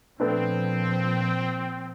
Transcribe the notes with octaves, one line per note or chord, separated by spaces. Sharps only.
A#2 F3 A3 B3 C4 D4